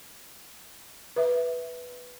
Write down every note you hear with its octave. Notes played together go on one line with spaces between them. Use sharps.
B4 E5